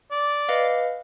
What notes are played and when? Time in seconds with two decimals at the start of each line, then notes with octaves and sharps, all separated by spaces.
0.11 D5
0.49 B4 D#5 F5